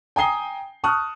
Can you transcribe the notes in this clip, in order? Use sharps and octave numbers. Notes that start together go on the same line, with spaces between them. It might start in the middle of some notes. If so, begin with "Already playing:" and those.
G5 G#5 A#5 D#6 C7 G7
A5 C#6 D#6 F6 F#6